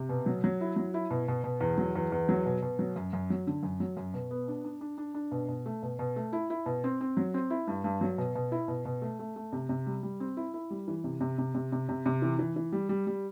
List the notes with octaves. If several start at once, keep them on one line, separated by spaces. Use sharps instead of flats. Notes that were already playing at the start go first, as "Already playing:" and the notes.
Already playing: C3
B2
F#3
F#3
E4
F#3
E4
B2
B2
B2
E2
F#3
E2
E2
F#3
B2
B2
F#3
F#2
F#2
F#3
D3
F#2
F#3
F#2
B2
B3
D4
D4
D4
D4
D4
B2
B2
A3
B2
B2
A3
E4
E4
B2
C4
C4
F#3
C4
E4
G2
G2
F#3
B2
B2
E4
B2
B2
A3
A3
A3
C3
C3
G3
G3
C4
E4
E4
G3
E3
C3
C3
C3
C3
C3
C3
C3
E3
E3
E3
G3
G3
G3